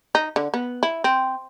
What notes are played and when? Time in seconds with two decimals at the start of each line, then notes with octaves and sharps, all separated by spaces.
0.15 D#4
0.36 D3
0.54 B3
0.83 E4
1.04 C4